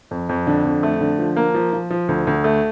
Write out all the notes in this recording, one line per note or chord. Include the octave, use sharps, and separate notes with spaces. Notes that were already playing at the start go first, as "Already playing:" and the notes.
F2
F2
D3
F2
A3
D3
F3
A#3
F3
F3
F3
D2
D2
A3